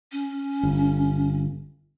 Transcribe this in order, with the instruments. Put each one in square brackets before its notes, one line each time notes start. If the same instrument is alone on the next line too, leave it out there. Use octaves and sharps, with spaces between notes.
[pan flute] C#4
[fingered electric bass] G1